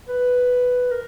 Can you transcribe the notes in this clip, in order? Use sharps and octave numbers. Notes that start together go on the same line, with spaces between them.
B4
A#4